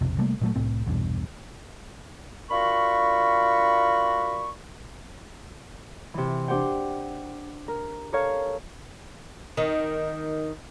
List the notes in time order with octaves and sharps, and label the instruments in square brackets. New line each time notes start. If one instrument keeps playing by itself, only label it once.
[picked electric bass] B1 F2 C3
C3 G3 A3 A#3
A#2 F#3 A3
C2 A2 C4
A#1 E2 G2 B2
[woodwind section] D4 F4 F#4 A#4 B5 C#6
[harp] C3 E3
D4 G4 C5 F#5 G5
A#4
A4 A#4 C#5 F5
[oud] D#3